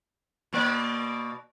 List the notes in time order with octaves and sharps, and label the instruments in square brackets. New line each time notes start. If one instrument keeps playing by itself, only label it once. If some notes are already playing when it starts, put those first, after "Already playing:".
[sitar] B2 A#3 D5